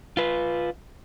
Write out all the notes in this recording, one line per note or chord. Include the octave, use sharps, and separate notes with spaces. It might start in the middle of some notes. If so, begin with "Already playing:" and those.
F4 B4